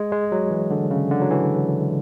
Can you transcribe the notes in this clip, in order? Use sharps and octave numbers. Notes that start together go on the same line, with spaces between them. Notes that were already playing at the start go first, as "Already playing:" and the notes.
Already playing: G#3
G#3
F#3
E3
D3
C#3
D3
F#3
E3